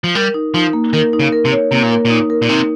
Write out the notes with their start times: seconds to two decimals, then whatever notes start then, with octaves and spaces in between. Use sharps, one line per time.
0.04 F3
0.15 G3 A#4
0.34 D#4
0.54 F3 D#4
0.73 A#3
0.93 D#3 A#4
1.13 D#4
1.20 C#3
1.32 A#4
1.45 C3
1.52 C#5
1.71 C3 A#3
1.83 A#2
1.91 A#4
2.05 A#2 D#4
2.30 A#4
2.42 A#2
2.49 C3 D#4